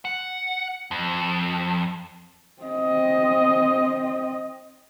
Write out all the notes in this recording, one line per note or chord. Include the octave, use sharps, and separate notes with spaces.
F#5
F2
C4 D#5